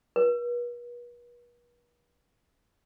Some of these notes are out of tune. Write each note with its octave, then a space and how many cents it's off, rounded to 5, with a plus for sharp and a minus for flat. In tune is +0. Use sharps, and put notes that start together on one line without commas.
B4 -40